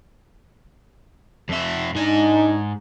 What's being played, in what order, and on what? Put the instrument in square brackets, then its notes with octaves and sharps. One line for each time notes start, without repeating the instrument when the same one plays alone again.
[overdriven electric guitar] F2 E5
[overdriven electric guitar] G#2 G#5 [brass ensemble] D4 D#4